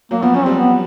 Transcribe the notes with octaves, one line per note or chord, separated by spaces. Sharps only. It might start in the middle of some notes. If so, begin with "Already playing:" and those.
F#3 A#3
F3 B3
F#3 C#4
G3 C4
B3